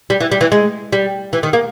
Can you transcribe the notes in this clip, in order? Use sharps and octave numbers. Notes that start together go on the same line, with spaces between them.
G3
E3
G3
E3
G#3
G3
E3
D#3
A#3